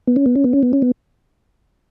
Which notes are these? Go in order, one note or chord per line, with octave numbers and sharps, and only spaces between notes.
B3
C#4
B3
C#4
B3
C#4
B3
C#4
B3